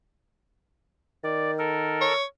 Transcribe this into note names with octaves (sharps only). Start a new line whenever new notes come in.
D#3 D5
A4 A#4
C#5